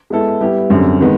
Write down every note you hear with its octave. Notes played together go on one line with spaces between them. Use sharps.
G#3 B3 E4 A4
G3 B3 E4 G4
F#2 D3 G3 C4
D#3 G#3 B3